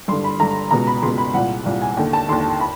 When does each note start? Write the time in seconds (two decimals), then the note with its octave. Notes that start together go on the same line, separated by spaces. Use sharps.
0.08 G2 D3 C6
0.24 B5
0.39 G2 D3 A#5
0.71 C#2 B2 A#5
0.87 B5
1.02 C#2 B2 C6
1.18 B5
1.34 C2 A#2 F#5
1.66 C2 A#2
1.82 G#5
1.97 D#2 D3 G5
2.13 A5
2.29 D#2 D3 C6
2.60 B5